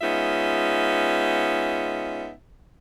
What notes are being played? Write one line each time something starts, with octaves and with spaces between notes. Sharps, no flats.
G#3 B3 C#4 D#4 F4 E5